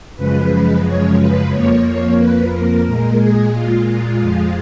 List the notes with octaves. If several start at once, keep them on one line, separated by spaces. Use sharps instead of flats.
F#2 C#3 F3 G#3 B4
C#5
B4
F2 F3 A#3 C#5
C#5
B4
A#4
A#2 G#3 A#4
G#4
F4
F4
F2 F3 G#3 F4